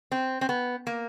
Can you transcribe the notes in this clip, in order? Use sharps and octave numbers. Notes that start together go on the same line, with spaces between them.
C4
C4
B3
A#3